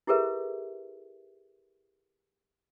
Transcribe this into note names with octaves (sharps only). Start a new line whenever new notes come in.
E4 G4 G#4 A#4 B4 E5